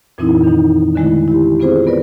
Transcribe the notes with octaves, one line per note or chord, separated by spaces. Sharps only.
F2 A#2 E3 C4 D#4 E4
D#3 D#4
D3 D#3 G#3 A3 E4
E4 G4
B3 C4 F4 G#4 C5
B3 A#4 B4 D5